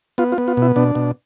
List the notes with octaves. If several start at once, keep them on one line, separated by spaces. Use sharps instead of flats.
B3 F4
F4
B3
F4
B2 E4
B2 D4
B2